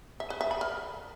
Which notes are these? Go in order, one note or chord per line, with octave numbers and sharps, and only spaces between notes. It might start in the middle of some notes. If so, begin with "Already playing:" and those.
E5
B4
E5
B5
A#4